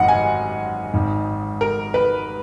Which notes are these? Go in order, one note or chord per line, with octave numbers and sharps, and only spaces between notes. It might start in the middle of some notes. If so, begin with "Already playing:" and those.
Already playing: G#1 F#2 D#3 D#5 F#5
G#5
G#1 G#2 D#3
A#4
B4